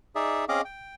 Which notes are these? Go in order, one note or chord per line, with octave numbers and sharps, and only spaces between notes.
D#4 G#4 D5 E5
C4 C#4 G#4 D#5 F5 D6
G5